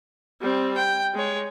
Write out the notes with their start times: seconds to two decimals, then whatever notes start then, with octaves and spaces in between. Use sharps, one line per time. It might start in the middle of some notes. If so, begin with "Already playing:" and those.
0.41 G3 C4
0.77 G5
1.14 G#3 C#5